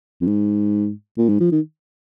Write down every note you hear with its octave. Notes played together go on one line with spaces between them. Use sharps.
F2
G#2
A#2
G#2
F3
D#3